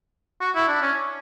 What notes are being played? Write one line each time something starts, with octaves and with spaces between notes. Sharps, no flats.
F#4
E4
D4
C#4